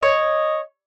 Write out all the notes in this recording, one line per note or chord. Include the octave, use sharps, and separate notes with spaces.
C#5 D#5